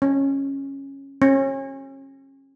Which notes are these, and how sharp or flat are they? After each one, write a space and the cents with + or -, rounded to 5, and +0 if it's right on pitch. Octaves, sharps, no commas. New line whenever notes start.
C#4 -15
C#4 -35